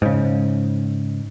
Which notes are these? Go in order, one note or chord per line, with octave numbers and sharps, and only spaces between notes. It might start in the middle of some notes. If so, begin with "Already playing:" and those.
G#2 C#3